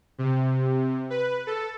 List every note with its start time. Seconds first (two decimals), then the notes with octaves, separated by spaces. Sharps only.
0.18 C3
1.10 B4
1.47 A4